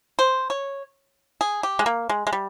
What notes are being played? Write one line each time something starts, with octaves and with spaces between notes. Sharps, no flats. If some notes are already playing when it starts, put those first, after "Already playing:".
C5
C#5
G#4
G4
G#3
A#3
G#3
G#3
G3